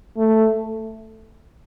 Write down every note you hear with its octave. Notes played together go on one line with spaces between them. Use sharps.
A3